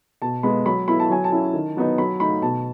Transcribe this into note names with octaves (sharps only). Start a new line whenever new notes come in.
B2 A5
G#3 B3 B5
F#3 B5
B3 E4 B5
A5
F#3 G#5
A5
C#4 E4
D#3
F#3 B3 D#4
F#3 B5
A3 D#4 B5
B2 A5